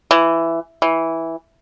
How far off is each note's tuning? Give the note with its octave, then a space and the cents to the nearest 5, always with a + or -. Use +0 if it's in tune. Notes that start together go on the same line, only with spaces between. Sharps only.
E3 +10
E3 -5